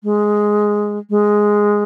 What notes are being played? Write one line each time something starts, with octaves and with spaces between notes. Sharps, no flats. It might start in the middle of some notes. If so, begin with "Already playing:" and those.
G#3
G#3